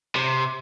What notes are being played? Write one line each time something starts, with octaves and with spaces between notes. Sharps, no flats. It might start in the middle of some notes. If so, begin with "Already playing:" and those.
C3